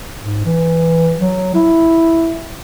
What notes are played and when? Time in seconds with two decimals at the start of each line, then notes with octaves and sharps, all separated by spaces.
0.22 G#2
0.45 E3
1.20 F#3
1.55 E4